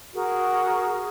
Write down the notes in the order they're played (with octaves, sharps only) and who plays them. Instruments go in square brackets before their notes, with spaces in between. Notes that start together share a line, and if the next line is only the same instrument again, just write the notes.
[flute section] F#4 G#4 A#4